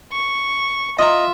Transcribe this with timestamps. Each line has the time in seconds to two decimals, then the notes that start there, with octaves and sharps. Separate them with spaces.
0.12 C#6
0.99 F4 D#5 E5 A#5